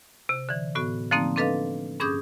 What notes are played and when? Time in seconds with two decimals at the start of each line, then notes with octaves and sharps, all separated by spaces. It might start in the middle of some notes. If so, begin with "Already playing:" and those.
0.29 C3
0.49 D3 E3
0.75 A2 B3 F#4
1.11 D3 F3 A3 A#3 C4 D#4
1.36 C4 D4 A4 B4 D#5 F5
2.00 G2 C#4 G#4 D6 D#6 G6